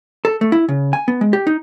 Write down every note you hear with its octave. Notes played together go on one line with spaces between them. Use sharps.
A4
A3
E4
C#3
G#5
B3
G#3
G4
D#4